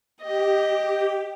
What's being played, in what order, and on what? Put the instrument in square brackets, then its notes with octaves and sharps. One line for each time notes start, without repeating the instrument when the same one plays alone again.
[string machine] G4 [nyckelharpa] D#5